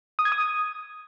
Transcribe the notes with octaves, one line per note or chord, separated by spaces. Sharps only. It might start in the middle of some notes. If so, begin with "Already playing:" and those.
D#6
G#6
D#6